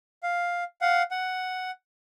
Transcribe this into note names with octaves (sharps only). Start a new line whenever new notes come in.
F5
F5 F#5
F#5